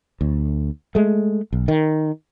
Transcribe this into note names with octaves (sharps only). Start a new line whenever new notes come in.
D2
G#3 A3
B1
D#3